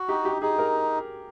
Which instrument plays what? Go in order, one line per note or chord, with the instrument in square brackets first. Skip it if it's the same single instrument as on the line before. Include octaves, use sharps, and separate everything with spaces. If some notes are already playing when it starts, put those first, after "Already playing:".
Already playing: [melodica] F#4
[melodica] D#4 [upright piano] G4
[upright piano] G4
[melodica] D#4 [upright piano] G#4
[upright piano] A#4